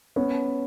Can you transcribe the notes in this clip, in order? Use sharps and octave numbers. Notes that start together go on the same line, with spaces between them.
B3 C#4